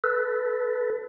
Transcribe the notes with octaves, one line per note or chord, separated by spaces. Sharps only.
A4 B4